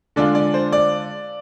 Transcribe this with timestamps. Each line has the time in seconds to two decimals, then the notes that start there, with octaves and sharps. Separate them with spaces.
0.16 D3 G#3 D4 F4 D5
0.35 D5
0.54 C5
0.72 D5